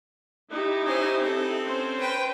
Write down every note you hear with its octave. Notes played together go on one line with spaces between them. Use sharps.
D#4 E4 G4
C#4 C5
C4 A4
C#4 C5
B4 G5